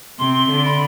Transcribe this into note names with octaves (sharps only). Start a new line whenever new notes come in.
C3 C6
D3
B5